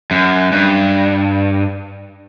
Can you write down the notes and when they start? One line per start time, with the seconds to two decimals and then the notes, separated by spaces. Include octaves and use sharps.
0.11 F#2
0.52 G2